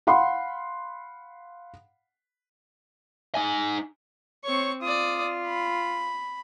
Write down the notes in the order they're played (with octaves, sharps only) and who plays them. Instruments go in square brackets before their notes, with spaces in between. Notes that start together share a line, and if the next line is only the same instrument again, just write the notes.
[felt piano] F5 F#5 B5 C6
[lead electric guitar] D#4 G#5
[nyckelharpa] C4 C#6 [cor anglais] C#5
[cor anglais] F4 [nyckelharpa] D5 D#6
[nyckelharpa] B5